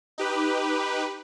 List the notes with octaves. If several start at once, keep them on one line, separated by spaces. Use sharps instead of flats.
D#4 G4 B4